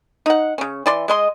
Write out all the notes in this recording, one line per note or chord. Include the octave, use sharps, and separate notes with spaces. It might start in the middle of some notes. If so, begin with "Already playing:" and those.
D#4 F#5
C#3 C#4
E3 D5 C6
G#3 D#5 C6